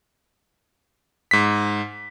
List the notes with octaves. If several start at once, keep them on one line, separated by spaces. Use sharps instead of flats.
G#2 B6